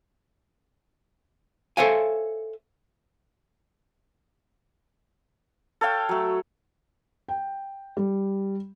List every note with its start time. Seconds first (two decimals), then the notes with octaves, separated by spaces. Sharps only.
1.77 A4 C5 C#5 E5 F5 G#5
5.81 A4 C#5 F5 G5
6.09 F#3 A3
7.28 G5
7.97 G3